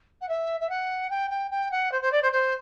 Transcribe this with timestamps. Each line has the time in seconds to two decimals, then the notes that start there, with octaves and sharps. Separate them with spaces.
0.21 F#5
0.28 E5
0.60 E5
0.69 F#5
1.09 G5
1.30 G5
1.50 G5
1.71 F#5
1.91 C5
2.01 C5
2.11 D5
2.22 C5
2.32 C5